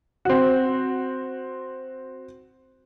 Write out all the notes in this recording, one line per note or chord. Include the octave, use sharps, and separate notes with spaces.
C4 F#4